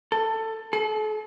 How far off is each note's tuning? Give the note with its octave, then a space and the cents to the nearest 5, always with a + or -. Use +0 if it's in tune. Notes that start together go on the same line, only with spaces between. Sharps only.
A4 +15
A4 -40